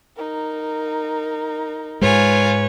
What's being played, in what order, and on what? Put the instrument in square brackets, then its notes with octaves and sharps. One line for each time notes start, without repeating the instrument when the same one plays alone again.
[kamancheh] D#4 A#4
[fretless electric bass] G#2 G#3 [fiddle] F4 G#5 [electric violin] B4 C#5